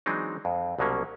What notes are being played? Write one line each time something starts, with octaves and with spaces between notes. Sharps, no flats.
E3 F#3 G#3 C4 D4 D#4
F2
C2 B2 F#3 A#3 C#4